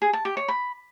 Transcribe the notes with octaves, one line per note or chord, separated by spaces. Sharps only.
G#4
A5
G4
C#5
B5